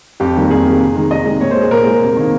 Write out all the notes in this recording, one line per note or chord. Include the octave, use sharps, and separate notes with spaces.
F2 G4
D#3 G3 A#3
F2 G#4
D#3 G3 A#3
C3
D#3 G#3
C3 D#5
D#3 G#3
A#2 C#5
C5
G#3
G#4
A#2 A#4
G#3
C3
D#3 A#3